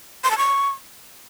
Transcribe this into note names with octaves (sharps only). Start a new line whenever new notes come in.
C6
A5
C#6